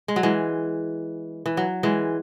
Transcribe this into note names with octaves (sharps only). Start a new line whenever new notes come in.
G#3
F#3
E3 G#3
E3
F#3
E3 G#3